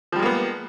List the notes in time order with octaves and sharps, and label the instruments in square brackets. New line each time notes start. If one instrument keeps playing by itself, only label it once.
[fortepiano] F3
G3
G#3
A#3
B3